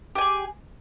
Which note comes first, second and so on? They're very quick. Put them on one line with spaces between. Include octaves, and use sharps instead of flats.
G4 G#5 G#4